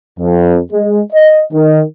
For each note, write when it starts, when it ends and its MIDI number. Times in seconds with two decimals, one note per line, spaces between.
0.19 0.58 41
0.72 0.99 56
1.12 1.41 75
1.53 1.81 51